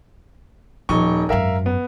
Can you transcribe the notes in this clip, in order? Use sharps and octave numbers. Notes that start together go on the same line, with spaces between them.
D#1 F3 D#4 C#6
G#1 F#2 A#4 E5 F5
B3